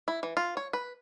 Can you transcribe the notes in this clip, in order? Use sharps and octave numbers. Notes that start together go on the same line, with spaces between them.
E4
E3
F4
C#5
B4